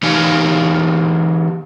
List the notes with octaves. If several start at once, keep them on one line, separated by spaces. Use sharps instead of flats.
E3 D#4 G4 C#5 F5 G#5